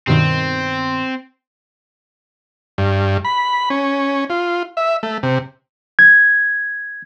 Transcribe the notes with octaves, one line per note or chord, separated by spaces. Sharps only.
G2 B2 D#3 C4
G2
B5
C#4
F4
E5
A3
C3
G#6